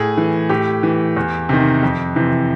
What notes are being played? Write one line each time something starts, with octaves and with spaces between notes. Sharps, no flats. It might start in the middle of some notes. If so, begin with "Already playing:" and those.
Already playing: A2 G#4
E3
A2 G4
E3
E2
C3 D#3
F2
C3 E3